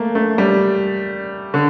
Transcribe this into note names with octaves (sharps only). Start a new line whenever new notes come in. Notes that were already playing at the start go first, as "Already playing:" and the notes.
Already playing: A3 A#3
A3
G3
D3